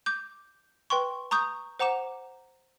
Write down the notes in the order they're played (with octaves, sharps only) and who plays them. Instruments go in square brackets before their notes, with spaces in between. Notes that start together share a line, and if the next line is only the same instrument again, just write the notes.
[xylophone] D6 G6
B4 G5 C6 C#6
A#5 C#6 D#6 G6
C5 F#5 A#5 D6 E7